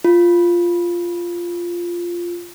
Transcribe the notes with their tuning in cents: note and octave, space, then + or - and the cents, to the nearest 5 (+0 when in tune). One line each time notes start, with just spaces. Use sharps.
F4 -5